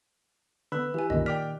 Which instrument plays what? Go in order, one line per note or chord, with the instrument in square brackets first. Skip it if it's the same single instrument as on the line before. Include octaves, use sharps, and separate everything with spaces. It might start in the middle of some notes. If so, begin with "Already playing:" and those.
[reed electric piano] D3 B3 [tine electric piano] B4 [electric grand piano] B5 E6 F#6
[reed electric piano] E3 [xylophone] G4 G#5
[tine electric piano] C2 F#2 D3 [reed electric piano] A#2 D#3 [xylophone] D#5
[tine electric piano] D5 [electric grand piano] G5 D6 F6 [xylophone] B6